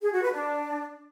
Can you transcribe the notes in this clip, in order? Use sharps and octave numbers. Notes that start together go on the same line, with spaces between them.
G#4
F#4
B4
D4